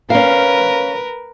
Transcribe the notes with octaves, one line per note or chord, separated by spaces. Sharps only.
C#4 A#4 B4 F5